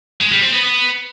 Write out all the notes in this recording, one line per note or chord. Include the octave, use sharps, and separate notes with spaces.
G#3
G3
C4
B3
B3